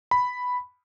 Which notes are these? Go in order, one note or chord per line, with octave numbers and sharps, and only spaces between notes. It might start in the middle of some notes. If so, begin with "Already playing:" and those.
B5